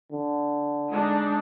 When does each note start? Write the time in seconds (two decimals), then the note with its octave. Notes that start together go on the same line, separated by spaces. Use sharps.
0.12 D3
0.90 G#3 D4 D#4